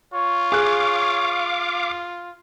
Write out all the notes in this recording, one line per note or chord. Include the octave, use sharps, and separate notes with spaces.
F4 C#5
G#4 F5 D6 F#6